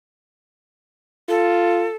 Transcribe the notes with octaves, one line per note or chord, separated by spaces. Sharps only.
F4 A4